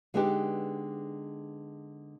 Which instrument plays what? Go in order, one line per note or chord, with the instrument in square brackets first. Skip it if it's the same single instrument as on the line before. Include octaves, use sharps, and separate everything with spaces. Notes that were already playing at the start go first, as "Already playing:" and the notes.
[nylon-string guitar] D3 G#3 B3 D4 D#4 G4